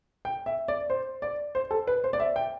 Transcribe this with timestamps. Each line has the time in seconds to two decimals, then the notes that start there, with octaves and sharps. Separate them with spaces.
0.25 G5
0.46 E5
0.68 D5
0.90 C5
1.22 D5
1.55 C5
1.71 A4
1.87 B4
2.04 C5
2.13 D5
2.20 E5
2.36 G5